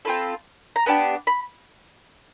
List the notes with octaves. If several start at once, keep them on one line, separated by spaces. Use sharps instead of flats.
C4 F4 A4 B5
A#5
B3 D4 G4 B5
B5